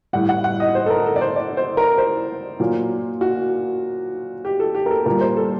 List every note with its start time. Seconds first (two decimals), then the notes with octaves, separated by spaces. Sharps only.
0.13 A2 G3 F#5
0.29 F#5
0.44 F#5
0.60 D#5
0.75 C5
0.86 A4
0.90 A#4
1.06 A4
1.16 D5
1.21 C5
1.36 D5
1.57 C5
1.77 A#4
1.98 C5
2.60 A#2 F#3
3.21 F#4
4.45 G4
4.60 A4
4.75 G4
4.86 A#4
4.91 A4
5.06 A#2 G3 A#4
5.21 C5
5.37 A4